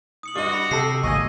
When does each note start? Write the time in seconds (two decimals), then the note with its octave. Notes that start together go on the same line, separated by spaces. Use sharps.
0.23 D#6 C#7 F#7
0.36 G2 F#4 D#5 D6 G7
0.53 B5
0.71 C3 G4 A4 E6 A#6 C7
1.03 G#1 D2 A#3 D#5 G#5 C#6